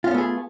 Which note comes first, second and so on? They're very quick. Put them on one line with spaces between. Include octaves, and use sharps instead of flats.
F4 C#4 B3 A3 G#4